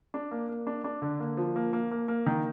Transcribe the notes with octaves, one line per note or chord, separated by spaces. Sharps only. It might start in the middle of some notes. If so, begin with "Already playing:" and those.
D4
A#3
A#3
D4
D4
D3
A#3
F3
A#3
A#3
A#3
A#3
D#3